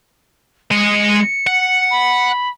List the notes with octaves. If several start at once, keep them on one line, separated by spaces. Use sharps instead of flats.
G#3 D#5 C#7
F#5
B5